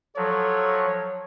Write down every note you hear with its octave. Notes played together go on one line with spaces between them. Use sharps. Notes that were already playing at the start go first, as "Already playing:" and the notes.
F3 F#3 A4 C#5